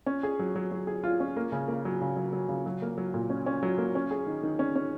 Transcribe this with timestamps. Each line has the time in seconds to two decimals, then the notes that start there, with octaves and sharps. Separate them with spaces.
0.06 C#4
0.23 G#4
0.39 F#3
0.56 F#3
0.71 F#3
0.87 G#4
1.04 F4
1.20 C#4
1.37 A#3
1.52 C#3
1.68 A#3
1.85 F#3
2.01 C#3
2.17 F#3
2.33 F#3
2.49 C#3
2.66 F#3
2.82 A#3
2.98 F#3
3.14 A#2
3.30 C#4
3.46 C#4
3.63 F#3
3.78 A#3
3.95 C#4
4.11 G#4
4.27 D#3
4.43 D#3
4.59 C#4
4.76 C#4